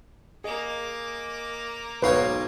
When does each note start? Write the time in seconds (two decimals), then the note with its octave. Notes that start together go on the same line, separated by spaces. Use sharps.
0.44 A#3 G#4 D#5 D6
2.03 B1 G#2 F4 F#4 B4 C#5 C7